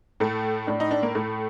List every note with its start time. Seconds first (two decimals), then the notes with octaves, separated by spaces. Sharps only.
0.20 A2 A3
0.67 A2 D4
0.80 D#4
0.91 D4
1.03 A#3
1.15 A2 A3